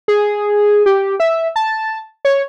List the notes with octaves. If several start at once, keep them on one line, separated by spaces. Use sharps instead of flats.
G#4
G4
E5
A5
C#5